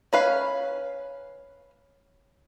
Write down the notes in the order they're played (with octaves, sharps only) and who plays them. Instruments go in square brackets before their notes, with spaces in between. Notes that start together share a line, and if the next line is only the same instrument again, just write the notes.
[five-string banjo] C#4 B4 F5